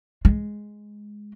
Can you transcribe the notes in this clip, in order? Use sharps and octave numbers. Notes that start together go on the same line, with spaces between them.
G#3